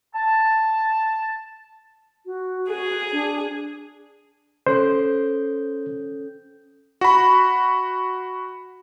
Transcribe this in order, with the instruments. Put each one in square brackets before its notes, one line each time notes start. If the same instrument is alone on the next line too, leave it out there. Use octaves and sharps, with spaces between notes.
[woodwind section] A5
[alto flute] F#4
[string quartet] G#4
[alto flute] D4
[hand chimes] C#4 A4 G6 [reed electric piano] C5
[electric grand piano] F#4 B5